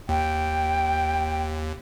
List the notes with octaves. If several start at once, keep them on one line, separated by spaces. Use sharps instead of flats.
D#2 G5